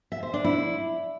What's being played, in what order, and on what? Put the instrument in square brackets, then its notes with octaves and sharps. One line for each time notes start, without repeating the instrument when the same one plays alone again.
[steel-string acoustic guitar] E5
C5
D4
E4